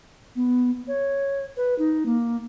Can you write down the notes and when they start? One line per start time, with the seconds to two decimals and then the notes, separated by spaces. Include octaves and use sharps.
0.36 B3
0.88 C#5
1.57 B4
1.78 D#4
2.06 A#3